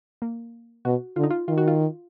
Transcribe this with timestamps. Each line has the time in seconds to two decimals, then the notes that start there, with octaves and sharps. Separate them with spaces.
0.22 A#3
0.85 B2 F#4
1.16 D3 F4
1.23 D#4
1.30 F4
1.48 D#3 F4
1.58 F#4
1.68 F4